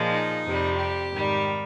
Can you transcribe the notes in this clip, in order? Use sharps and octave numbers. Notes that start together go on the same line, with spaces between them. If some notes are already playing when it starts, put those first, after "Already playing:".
Already playing: A#2 F3 G#3
D#4
F2 C3 G3
G4
G#2 D#3 G3